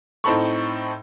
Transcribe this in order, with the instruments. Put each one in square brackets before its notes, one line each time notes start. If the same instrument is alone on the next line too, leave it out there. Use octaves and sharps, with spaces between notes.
[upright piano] A2 C4 D#4 A4 B5 C#6